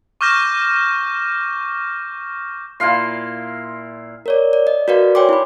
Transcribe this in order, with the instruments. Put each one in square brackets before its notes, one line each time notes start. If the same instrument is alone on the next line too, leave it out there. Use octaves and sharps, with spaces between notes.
[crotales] C#6 D6 F6 G6 A#6 E7
[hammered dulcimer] A#2 E4 F5 C6
[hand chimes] A#4 C#5 D5
D5
D#5
F#4 A#4 B4 D5 F5
C#5 G5 G#5 C6 D6
E4 B5